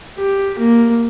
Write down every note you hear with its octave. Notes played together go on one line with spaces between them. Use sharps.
G4
A#3